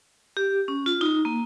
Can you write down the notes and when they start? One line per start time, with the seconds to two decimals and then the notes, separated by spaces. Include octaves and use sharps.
0.37 G4
0.68 C#4
0.86 F4
1.01 D#4
1.25 A#3